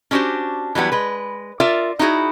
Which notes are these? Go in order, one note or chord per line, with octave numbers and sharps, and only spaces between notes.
C#4 D4 F#4 G4 C5
E3 F#3 G3 B3
G#3 B4
F4 A#4 D5 E5
D#4 E4 F#4 G#4